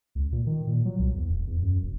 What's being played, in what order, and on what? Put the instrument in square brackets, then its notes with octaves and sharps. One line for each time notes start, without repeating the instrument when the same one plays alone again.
[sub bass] C#2
A#2
D#3
A#2
F#3
C2
E2
D#1
E2
F#2
F1